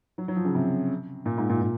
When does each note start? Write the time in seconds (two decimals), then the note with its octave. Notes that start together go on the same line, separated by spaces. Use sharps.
0.18 F#3
0.28 F#3
0.36 F3
0.45 C#3
0.55 C3
1.26 A#2
1.38 G#2
1.50 A#2
1.61 A#2